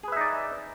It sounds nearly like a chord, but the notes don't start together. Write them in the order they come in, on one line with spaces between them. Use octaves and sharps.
G#4 B4 E5 D#4 D5